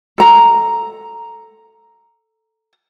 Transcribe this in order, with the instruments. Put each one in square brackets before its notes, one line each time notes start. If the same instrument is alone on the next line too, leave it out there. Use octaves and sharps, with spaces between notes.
[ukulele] A4 A#5